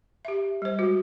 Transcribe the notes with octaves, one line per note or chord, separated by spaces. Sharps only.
G4 E5
G3 C5
G#3 F#4